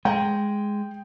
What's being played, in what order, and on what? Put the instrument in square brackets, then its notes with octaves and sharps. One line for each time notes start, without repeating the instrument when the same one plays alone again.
[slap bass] G#3 [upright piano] G5